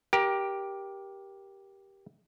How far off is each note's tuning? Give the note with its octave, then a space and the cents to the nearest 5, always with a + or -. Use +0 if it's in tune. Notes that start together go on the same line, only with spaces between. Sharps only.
G4 +0 A#4 +25